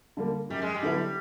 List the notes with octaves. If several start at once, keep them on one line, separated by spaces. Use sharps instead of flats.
D3 G3 A#3
F#2 G3
G#3
G3
D3 F#3 B3 E4